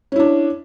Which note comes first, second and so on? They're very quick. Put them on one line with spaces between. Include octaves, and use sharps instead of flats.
C#4 E4 D4